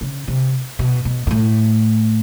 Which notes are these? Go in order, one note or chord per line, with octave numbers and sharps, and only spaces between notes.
C#3
C3
B2
B2
G#2
A2